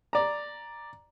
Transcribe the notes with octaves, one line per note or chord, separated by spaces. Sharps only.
D5 A#5